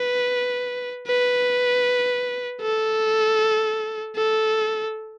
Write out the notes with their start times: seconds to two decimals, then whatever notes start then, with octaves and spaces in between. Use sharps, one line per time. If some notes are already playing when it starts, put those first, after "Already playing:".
Already playing: B4
1.07 B4
2.61 A4
4.16 A4